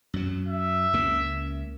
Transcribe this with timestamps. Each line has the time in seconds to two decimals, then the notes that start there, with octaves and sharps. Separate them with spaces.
0.14 F#2 F#3
0.48 E5
0.93 C#2 C#3 A#3